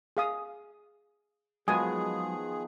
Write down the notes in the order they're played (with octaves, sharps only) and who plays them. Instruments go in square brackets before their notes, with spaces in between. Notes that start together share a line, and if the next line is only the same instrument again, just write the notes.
[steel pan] G#4 F5 D#6
[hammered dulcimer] D#3 F3 B3 [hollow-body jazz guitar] F#3 G#3 [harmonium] G#4 [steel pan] G#5 D#6